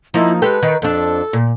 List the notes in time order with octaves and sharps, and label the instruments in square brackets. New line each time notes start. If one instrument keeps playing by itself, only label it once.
[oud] F3 A#3 D#4 [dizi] E4
[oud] G#3 G4 A4 [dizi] B4
[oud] D#3
[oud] F2 D4 [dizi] A4
[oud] A#2